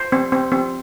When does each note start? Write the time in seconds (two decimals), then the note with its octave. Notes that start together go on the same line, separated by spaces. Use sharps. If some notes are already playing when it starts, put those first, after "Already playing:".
Already playing: C5
0.12 C4
0.32 C4
0.52 C4